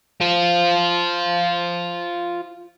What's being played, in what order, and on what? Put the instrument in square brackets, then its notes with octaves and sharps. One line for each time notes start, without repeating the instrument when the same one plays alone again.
[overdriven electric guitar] F4 C5